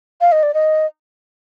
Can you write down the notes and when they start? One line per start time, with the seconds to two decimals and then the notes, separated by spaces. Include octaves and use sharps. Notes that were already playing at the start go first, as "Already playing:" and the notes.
0.21 F5
0.32 D#5
0.43 D5
0.54 D#5